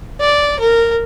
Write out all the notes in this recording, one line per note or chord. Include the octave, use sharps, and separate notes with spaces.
D5
A#4